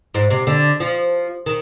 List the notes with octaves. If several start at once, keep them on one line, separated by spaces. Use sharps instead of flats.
G#2
C3
D3
F3
D#3